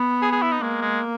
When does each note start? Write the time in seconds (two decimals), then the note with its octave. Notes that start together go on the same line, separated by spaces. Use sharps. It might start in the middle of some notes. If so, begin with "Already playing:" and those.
Already playing: B3
0.22 G#4
0.32 G#4
0.42 E4
0.52 D#4
0.62 G#3 A#3
0.82 G#3